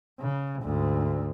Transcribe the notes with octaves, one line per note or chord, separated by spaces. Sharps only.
C#3
D2 G#2